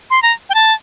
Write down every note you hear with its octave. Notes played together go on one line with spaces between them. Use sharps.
C6
A#5
G5
A5